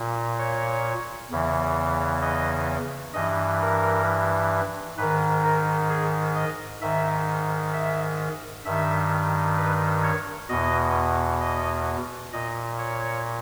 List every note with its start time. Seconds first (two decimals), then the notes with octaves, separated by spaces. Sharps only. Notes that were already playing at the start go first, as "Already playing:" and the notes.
Already playing: A#2
0.39 C#5
1.31 E2 C#3 E3
2.22 D#5
3.14 G2 E3 D#5
3.60 A#4
4.98 G#2 D#3 B4
5.44 A#4
5.89 G#4
6.36 D#5
6.81 G#2 D#3 E5
7.73 E5
8.65 G2 D#3 E5
9.57 B4
10.03 C#5
10.49 E2 B2 D#5
11.41 D#5
12.33 A#2 D#5
12.78 C#5